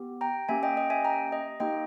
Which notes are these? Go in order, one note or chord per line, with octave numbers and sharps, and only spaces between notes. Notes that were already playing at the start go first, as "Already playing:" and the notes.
Already playing: B3 G4
G5 A#5
A#3 C#4 G4 E5 G#5
D#5 G5
D#5 G5
E5 G#5
G5 A#5
D#5
A#3 D#4 G4 D#5 G5